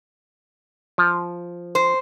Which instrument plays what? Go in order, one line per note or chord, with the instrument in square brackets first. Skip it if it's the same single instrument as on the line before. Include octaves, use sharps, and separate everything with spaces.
[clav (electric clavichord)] F3
[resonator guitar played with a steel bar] C5